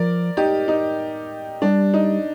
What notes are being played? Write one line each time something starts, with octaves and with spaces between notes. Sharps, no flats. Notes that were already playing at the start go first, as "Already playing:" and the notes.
Already playing: F3 A#4 D5
D#4 G4
D#4
G3 D4
D#4